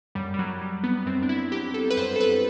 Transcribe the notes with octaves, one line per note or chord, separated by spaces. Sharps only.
F#2 G3
G3
F#3
F#3 G3
B3
F#2 C4
D4
E4
F#3 G4
A4
B4
F#2 C5
A4
B4